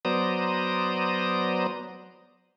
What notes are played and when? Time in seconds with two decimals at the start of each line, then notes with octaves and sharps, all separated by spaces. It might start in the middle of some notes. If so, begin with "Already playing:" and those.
0.05 F#3 B3 C5 D5 A#5 D#6